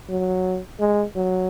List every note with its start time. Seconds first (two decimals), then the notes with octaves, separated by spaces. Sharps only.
0.10 F#3
0.80 G#3
1.16 F#3